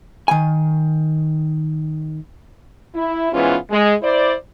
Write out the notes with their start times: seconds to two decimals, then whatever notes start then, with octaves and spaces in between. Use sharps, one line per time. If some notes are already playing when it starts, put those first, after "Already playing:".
0.28 D#3 G#5
2.95 E4
3.33 G#2 E3 B3 C#4 F4
3.71 G#3
4.03 E4 C5 D5